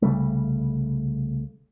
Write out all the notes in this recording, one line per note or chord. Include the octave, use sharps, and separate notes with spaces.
C2 C#3 G3 A3